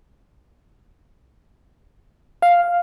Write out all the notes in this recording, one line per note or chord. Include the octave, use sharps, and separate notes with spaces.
F5